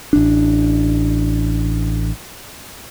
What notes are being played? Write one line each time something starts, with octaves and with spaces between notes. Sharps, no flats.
A1 D4